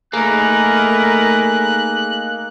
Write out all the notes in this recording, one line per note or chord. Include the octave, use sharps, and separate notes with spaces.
A3 A#3 D#4 G#4 A#4 B4 F#6